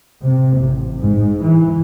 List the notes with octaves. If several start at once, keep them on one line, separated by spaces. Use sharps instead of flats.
C3
A1
G#2
E3